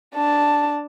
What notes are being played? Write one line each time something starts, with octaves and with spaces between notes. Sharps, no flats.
D4 A5